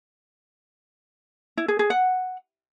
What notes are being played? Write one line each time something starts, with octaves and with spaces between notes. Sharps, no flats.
E4
G#4
G#4
F#5